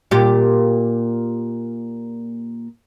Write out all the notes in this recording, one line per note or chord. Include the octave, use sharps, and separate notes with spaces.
A#2 G4